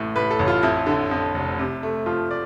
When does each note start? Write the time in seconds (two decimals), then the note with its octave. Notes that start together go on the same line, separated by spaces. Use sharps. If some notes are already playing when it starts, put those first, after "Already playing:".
Already playing: A1 A2 E3
0.16 A2 B4
0.31 A4
0.39 A1
0.48 F4
0.63 F2 E4
0.86 D3
1.11 F2
1.35 F1
1.59 C3
1.83 A3
2.06 F3 F4
2.31 D5